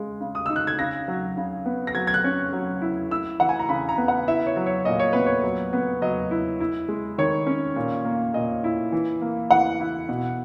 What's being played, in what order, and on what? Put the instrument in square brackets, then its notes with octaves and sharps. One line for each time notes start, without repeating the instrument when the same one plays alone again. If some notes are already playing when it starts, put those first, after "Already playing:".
Already playing: [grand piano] C#3 G#3
C#3
D#6
D#4 E6
F#6
G#6
C#3 A#6
F#3
C#3
B3
A#6
F#3 G#6
G#6
F#6
C#4
F#3
E4
E4 E6
E3 F#5
G#5
A#5
C#3 B5
A#5
B3
F#5
E4 E5
C#5
F#3
C#5
A#2 D#5
C#5
B3 B4
C#5
F#3
B3
F#3 D#5
E4
E4
G#3
D#3 C#5
C#4
A#2
A#3
A#2 D#5
E4
E3
A#3
E3 F#5
E4
B2